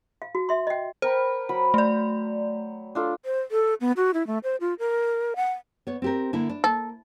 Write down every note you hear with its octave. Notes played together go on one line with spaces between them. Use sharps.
F5
F#4
E5 C6
D#5 G5
A#4 C5 G5 B5
F#3 B5
A3 D5
D4 F4 A4
C5
A4
B3
F#4
E4
A3
C5
F4
A#4
F#5
B3 C#5
C4 G4 A#4
D3 A#3 E4
D4
A#3 A4